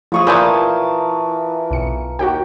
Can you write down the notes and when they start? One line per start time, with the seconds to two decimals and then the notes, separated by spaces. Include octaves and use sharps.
0.12 F3 A3 F4 G#4 C#6 D#6
0.27 A#2 E3 A#4 B4 A5 D#6 G6 G#6
1.71 B1 C#7
2.19 D#2 F#4 G4 G5